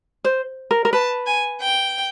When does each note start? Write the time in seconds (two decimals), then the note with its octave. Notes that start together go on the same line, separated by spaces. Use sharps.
0.24 C5
0.71 A#4
0.85 A#4
0.93 B4 A5
1.27 G#5
1.61 G5